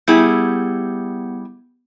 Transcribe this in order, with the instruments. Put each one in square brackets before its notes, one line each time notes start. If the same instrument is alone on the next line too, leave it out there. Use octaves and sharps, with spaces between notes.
[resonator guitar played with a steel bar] G3 E4 G#4 [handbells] B3 G6 C#7